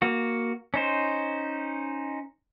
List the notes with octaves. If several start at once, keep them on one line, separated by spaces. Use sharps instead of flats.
A#3 F#4
C#4 D#4 C5